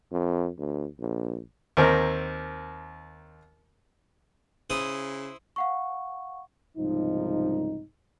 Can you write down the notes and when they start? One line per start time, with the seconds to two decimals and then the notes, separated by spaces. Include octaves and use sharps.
0.12 F2
0.58 D2
1.00 A#1
1.77 D#2 C4 A#4
4.70 C#3 E4 C5 D#6
5.56 F5 F#5 C#6
6.77 C2 G#2 C#3 F3 D#4